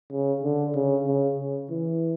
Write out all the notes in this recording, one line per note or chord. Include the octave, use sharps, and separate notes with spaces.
C#3
D3
C#3
C#3
C#3
E3